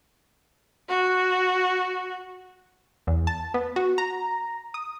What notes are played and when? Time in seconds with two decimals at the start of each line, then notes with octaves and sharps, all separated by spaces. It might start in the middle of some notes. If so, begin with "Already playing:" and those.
0.89 F#4
3.07 E2
3.27 A5
3.54 B3
3.76 F#4
3.98 A#5
4.74 D#6